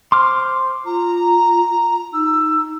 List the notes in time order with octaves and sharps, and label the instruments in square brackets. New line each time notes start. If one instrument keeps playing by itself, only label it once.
[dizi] C5 [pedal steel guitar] C6 D6 F6
[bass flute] F4 [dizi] A#5
[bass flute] D#4 [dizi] E6